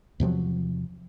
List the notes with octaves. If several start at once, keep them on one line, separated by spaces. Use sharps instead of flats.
E2 C3 F3 F#3